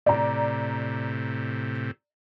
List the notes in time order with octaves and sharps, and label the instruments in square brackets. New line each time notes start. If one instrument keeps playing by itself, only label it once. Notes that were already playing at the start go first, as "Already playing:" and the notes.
[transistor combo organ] A2 C3 [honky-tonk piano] D5 A#5